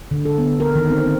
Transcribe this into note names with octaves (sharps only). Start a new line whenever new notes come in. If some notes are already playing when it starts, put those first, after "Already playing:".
D3
A4
B3
A#4
D#3
C4
C4